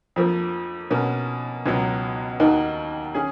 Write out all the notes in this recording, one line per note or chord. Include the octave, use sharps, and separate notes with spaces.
F2 F3 A#3
B2 A#3 C#4
C#2 B2 F#3
D#2 D#3 A#3 D#4 F#4
C#4 G#4